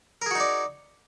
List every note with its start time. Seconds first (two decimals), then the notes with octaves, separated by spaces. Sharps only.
0.22 A#4
0.26 G#4
0.31 F#4
0.35 D#4
0.40 D5